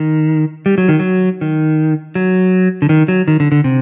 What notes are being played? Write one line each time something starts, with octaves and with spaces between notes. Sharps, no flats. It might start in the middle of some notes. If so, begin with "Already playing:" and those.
Already playing: D#3
G3
F#3
D#3
F#3
D#3
F#3
D3
D#3
F#3
D#3
D3
D3
C3